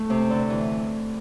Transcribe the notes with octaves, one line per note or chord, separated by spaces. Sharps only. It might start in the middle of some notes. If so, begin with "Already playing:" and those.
Already playing: A3
C3
D3
E3